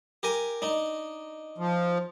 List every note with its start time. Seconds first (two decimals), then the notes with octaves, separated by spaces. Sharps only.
0.23 G4 A#4 G#5
0.62 D4 D#4
1.58 F3